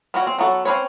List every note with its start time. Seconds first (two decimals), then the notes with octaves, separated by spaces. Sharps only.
0.14 G3 C#4 F#4
0.27 C4
0.38 F#3 B3 F#4 A4
0.65 C4 C#4 D#4 B4 C#5